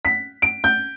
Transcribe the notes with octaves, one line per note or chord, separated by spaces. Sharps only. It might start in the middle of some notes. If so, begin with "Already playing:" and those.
B6
D7
G6